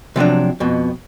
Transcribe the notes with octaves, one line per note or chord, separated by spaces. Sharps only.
C3 F3 F#3 D4
F2 B2